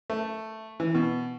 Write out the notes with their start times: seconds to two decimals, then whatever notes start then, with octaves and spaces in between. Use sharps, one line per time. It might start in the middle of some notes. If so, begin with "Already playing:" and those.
0.10 A3
0.80 E3
0.95 B2